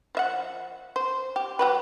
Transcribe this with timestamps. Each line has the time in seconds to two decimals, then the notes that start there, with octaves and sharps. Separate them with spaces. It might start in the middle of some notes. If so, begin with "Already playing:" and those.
0.15 F3 E5 F#5
0.96 C5
1.36 G4
1.59 F#3 G4 B4